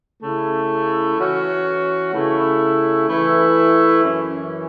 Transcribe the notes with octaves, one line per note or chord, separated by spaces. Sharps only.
C#3 A3 E4
E3 C#4 F#4
C#3 A3 E4
E3 A3 E4
F#2 E3 C#4